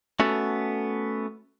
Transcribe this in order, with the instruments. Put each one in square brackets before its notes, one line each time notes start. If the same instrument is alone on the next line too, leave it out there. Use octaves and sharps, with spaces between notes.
[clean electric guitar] A3 B3 C#4 F#4 A4